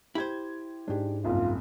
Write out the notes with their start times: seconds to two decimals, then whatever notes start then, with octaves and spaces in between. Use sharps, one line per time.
0.15 E4 G4 C5 G#6
0.88 G#2 G#3 D4 G4
1.24 F#1 C2 F4